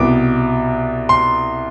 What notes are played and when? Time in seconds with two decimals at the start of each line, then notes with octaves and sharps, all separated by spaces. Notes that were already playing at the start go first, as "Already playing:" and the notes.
Already playing: C2 B2 D6
1.09 C6